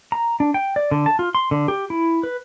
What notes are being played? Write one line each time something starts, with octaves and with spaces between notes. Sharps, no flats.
A#5
D4
G5
D5
D3
A5
F4
C6
D3
G4
E4
B4